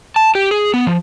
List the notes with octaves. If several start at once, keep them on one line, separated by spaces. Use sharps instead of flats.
A5
G4
G#4
B3
F3